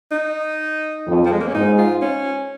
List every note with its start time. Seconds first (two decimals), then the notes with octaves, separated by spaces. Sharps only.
0.11 D#4
1.07 F2
1.25 F3
1.32 G#3
1.40 A#3
1.47 C#4
1.54 G#2 D#4
1.78 F4
2.02 C#4